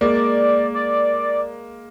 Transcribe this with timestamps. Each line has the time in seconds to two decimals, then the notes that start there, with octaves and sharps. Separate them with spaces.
0.01 G#3 A#3 D5
0.74 D5